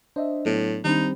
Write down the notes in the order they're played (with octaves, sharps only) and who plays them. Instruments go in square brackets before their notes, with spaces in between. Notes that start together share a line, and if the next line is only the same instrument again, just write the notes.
[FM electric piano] D4 [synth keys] C5 D#5 E5
[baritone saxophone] A2 [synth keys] F#3 B3
[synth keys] D#3 D4 B5 [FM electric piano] G3 C4 [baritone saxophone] D#4